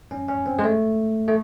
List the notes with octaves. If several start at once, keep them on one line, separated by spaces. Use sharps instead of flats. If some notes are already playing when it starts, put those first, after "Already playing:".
C#4
C#4
C4
G#3
A3
A3